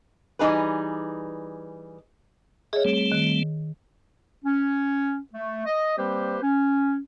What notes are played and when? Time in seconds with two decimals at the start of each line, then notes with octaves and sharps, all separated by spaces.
0.39 E3 G3 D#4 G#4 B4
2.73 G#4 C#5 D#5 E5
2.85 G3 A3 C4
3.12 D#3
4.45 C#4
5.33 A3
5.66 D#5
5.97 G3 A#3 C4 G4 B4 C5
6.42 C#4